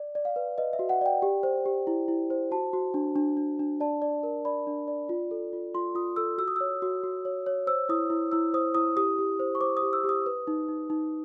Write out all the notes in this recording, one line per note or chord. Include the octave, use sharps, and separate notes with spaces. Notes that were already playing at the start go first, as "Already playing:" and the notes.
Already playing: D5
D5
F5
B4
B4 D#5
E5
F#4
F#5
D5 G5
G4
C5
G4
E4
E4
C5
F#4 A5
F#4
D4
D4
D4
D4
D5 A5
D5
A#4
D5 B5
D4
D5
F4
A4
F4
F4 C6
F4 D#6
A4 E6
F#4 E6
D#6
C#5 E6
F#4
F#4
C#5
C#5
C5 E6
E4 D#6
E4
E4 E6
C5 D#6
E4 D#6
G4 D#6
G4
C5
C#6
C5 D6
D#6
G4
E6
G4
D#6
B4
D#4
D#4
D#4